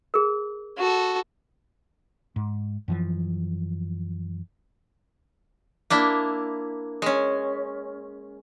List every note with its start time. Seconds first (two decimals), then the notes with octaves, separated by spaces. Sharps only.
0.14 G#4 A#4
0.78 F#4 A4
2.36 G#2
2.88 F#2 E3 F3
5.90 A#3 D4 E4
7.02 G#3 C#4